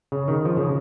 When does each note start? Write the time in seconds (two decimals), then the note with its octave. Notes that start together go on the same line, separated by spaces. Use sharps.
0.12 C#3
0.28 D#3
0.45 F3
0.57 C#3